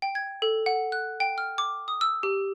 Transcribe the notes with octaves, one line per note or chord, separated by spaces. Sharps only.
G5
G#6
A4
F#5
F#6
G5
F6
D6
D#6
E6
G4